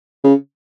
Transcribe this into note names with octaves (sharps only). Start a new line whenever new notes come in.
C#3